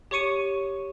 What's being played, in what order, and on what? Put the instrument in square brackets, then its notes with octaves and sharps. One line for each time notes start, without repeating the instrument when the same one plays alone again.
[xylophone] G4 C#5 C#6 C#7 D#7